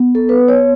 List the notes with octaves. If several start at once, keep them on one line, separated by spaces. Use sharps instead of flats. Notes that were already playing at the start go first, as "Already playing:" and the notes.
Already playing: B3
A4
B4
C#5